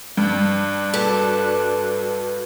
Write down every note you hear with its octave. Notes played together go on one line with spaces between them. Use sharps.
G2 D4
F#4 A4 B4